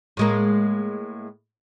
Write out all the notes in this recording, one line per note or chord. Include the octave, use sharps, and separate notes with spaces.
A2 G#3 A#3